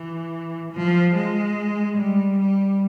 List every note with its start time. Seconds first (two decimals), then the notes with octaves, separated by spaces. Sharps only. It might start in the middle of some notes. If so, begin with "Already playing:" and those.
Already playing: E3
0.73 F3
1.15 G#3
1.97 G3
2.39 G3